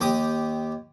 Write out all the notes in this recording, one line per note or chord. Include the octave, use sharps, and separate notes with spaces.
D#2 G4 D#6